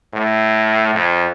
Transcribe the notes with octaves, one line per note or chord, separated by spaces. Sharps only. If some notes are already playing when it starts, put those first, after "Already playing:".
A2
F2